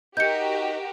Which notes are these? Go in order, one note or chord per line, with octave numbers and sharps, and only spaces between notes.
D#4 F#4 G4 A#4 G6 C#7